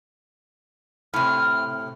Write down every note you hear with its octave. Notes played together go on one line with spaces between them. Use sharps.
A2 C3 F6